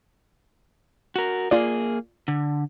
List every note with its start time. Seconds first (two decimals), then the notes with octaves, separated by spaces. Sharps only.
1.16 F#4 A#4
1.51 A#3 F4 G#4 D5
2.28 D3